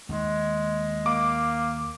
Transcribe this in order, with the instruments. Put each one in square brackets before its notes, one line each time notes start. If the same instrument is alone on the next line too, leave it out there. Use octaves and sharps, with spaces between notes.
[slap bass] D#2 D#3 [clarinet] G#3
[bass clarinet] A#3 [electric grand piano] D6